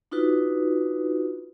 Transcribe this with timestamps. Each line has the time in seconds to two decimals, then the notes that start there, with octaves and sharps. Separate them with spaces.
0.11 D4 D#4 F4 F#4 B4